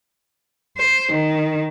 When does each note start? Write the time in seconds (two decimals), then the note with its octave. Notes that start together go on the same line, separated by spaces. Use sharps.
0.78 C5
1.12 D#3